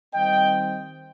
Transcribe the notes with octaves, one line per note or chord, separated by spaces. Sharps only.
D#3 G3 C4 D#5 G5